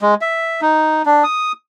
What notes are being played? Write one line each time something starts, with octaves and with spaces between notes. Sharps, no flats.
G#3
E5
D#4
D4
D#6